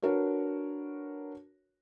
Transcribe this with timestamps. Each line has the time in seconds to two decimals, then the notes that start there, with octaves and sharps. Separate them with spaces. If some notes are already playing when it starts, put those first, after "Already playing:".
0.02 D4 F#4 A#4 B4 C#5